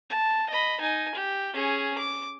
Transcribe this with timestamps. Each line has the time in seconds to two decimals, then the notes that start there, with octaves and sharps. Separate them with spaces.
0.10 A5
0.50 D#5 B5
0.81 D#4 G#5
1.15 G4
1.54 C#4 G#4
1.98 D6